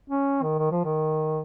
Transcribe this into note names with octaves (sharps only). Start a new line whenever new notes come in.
C#4
D#3
D#3
F3
D#3